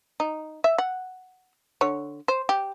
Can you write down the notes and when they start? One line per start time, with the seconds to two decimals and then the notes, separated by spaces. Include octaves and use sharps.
0.20 D#4
0.64 E5
0.78 F#5
1.81 D3 C#5
2.28 C5
2.49 G4